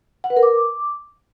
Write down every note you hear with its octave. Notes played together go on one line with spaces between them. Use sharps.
F#5
B4
A#4
D6